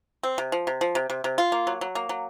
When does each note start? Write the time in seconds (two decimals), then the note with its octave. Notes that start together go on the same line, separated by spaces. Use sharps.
0.23 C4
0.38 C3
0.52 F3
0.67 C3
0.81 F3
0.95 C3
1.10 C3
1.24 C3
1.38 F4
1.52 A#3
1.67 F#3
1.81 F#3
1.95 A#3
2.09 F#3